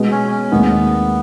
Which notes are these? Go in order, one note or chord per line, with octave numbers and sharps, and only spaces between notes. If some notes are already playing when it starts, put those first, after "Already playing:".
Already playing: B2 G#3 B3
C#4
C#4
D#2 D#3 G#3 B3 C4 D#4